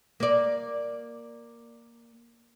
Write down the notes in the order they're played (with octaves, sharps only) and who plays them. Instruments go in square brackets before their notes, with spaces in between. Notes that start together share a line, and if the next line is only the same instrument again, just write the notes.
[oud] A#3 D5